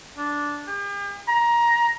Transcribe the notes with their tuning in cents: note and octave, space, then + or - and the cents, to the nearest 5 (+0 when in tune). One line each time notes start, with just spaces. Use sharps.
D4 -10
G4 +45
A#5 +20